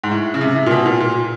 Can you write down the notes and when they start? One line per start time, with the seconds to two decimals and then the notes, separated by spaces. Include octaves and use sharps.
0.03 G#2
0.11 A2
0.34 C#3
0.41 C3
0.56 C3
0.66 A#2
0.71 B2
0.86 A#2
1.00 A#2